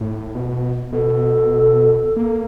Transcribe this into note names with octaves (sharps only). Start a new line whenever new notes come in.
A2
B2
B2 A4
A#3